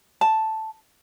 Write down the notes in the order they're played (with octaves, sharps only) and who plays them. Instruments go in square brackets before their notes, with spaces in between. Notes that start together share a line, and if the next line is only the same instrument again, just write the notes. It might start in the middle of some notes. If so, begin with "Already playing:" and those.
[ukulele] A5